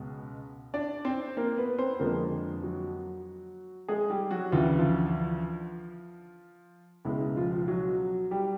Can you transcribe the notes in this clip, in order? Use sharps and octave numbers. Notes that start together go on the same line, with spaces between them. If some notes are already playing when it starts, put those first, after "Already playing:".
Already playing: C#2 B2 G#3
D4 D5
C4 C5
A#3 A#4
B3 B4
C4 C5
B4
F2 D3 F3 G#3 A#3 A#4
F#3 F#4
G#3 G#4
G3 G4
F#3 F#4
D2 C#3 E3 F4
E4
F3 F4
C#2 B2 G#3 E4
E4
F3 F4
F3 F4
F#3 F#4
G3 G4